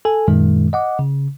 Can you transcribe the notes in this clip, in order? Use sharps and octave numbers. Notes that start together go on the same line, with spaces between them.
A4 G#5
F#2 A#2 D#3 G#3
D#5 F#5 D6
C#3